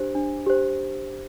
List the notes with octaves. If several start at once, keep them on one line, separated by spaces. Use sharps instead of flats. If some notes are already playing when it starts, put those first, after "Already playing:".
Already playing: D4 G4 C5
D4
G4 C5